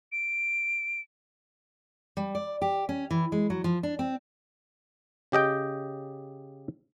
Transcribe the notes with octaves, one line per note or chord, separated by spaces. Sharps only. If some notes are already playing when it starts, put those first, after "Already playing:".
D7
G3
D5
G4
C#4
E3
G#3
F#3
F3
D4
C4
C#3 G4 D#5 G5